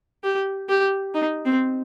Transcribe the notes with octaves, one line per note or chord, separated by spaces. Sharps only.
G4
G4
D#4
C4